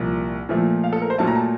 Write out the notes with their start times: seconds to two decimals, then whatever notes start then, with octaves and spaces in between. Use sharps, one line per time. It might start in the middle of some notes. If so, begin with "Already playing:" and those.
Already playing: C2 A#2 F3 A#3
0.49 A#2 F3 A3
0.84 F5
0.93 A4
1.02 A#4
1.10 C5
1.18 A#2 F#3 A3 A5
1.27 A#5
1.36 A5